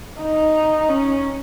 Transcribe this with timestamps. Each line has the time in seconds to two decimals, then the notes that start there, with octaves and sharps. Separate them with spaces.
0.22 D#4
0.89 C#4